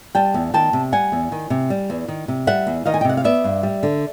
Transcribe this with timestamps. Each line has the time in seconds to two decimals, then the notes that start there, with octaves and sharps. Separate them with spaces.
0.15 G3 G5 A5
0.34 E2
0.54 D#3 G5 A5
0.73 C3
0.92 G3 F#5 G#5
1.12 E2
1.32 D#3
1.50 C3
1.70 G3
1.90 E2
2.08 D#3
2.28 C3
2.47 G3 E5 F#5
2.67 E2
2.86 D#3 D#5 F5
2.94 G#5
3.01 G5
3.05 C3 F#5
3.17 F5
3.24 B3 D5 E5
3.44 G2
3.63 G3
3.83 D3